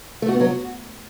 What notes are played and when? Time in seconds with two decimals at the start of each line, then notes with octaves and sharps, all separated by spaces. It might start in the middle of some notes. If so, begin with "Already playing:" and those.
0.22 A3
0.28 F#4
0.34 B3
0.41 F#3
0.47 F#4